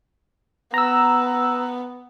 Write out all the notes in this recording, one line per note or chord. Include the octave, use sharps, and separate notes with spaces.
B3 A#5 E6